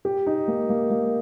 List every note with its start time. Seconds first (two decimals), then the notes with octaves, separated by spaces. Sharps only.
0.05 G4
0.27 D#4
0.48 A#3
0.70 A#3
0.90 A#3